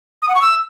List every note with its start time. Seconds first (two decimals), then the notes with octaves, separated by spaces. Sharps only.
0.22 D#6
0.29 F#5
0.35 C#6
0.42 E6